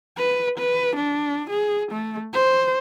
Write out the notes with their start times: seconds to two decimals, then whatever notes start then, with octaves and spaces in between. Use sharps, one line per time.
0.18 B4
0.58 B4
0.96 D4
1.50 G#4
1.92 A3
2.33 C5